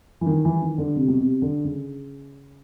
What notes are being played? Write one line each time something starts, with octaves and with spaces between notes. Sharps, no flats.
E3
D#3
E3
D#3
D3
C3
B2
C3
D3
C#3